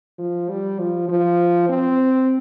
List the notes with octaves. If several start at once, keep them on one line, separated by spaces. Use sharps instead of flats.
F3
G3
F3
F3
C4